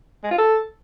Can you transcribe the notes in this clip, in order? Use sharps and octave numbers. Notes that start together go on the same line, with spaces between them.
G#3
F4
A4